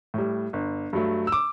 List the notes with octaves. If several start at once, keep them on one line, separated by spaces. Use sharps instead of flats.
A2 G3
G1
G2 F#3 A3
E6
D6